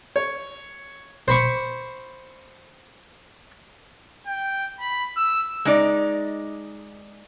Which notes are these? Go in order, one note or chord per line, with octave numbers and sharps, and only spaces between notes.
C#5
C5 B5 C#6
G5
B5
E6
G#3 D#4 D5